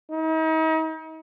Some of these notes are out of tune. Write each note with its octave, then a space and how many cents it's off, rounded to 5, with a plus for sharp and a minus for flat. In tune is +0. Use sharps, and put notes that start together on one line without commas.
D#4 +40